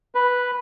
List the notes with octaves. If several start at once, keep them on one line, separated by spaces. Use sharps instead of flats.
B4